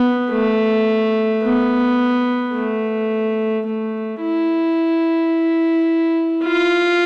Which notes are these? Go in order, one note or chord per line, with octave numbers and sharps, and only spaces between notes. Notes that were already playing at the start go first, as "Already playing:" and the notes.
Already playing: B3
A3
B3
A3
A3
E4
F4